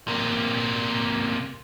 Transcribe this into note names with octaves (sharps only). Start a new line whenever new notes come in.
C3 A#3